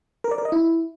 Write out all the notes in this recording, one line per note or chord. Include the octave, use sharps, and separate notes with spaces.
A#4
D5
A#4
D#5
E4